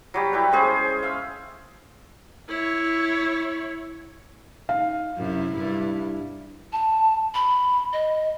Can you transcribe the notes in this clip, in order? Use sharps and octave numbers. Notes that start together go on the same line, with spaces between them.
F#3 G3 G4
E4 G4 B4
G#3 C#4 G#4 C5
E5 F5
E4 C#5
D#4 F5
F#2 C3 E4
G2 E4
A5
B5
D#5